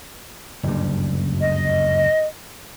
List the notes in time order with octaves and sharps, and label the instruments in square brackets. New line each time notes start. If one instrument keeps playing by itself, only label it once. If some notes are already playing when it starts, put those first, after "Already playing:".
[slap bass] F#1 D2 G2
[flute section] D#5